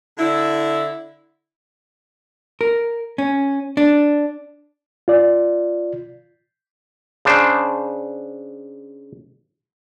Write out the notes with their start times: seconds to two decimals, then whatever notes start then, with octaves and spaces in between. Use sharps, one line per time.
0.18 D3 E4
2.61 A#4
3.18 C#4
3.77 D4
5.08 F4 D5
7.25 C#3 D4 C5